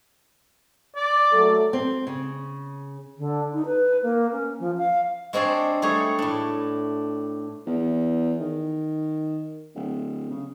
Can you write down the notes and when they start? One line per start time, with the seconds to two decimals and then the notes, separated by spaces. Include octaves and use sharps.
0.96 D5
1.31 F#3 A3 A4
1.73 C4
2.07 C#3
3.17 D3
3.53 D#4
3.66 B4
4.03 A#3
4.32 C#4
4.60 F3
4.78 F5
5.33 G#3 C4 D4 C#5 D5
5.82 G3 A3 G#4 A4 C#5
6.19 A2 D4
7.67 E2
8.40 D#3
9.75 D1
10.30 C#3